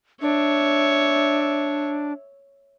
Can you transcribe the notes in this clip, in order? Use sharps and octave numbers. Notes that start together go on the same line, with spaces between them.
D4 C#5 E5